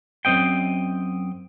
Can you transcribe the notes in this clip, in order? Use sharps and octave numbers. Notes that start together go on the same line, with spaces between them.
F#2 E3 C4 D#5 G5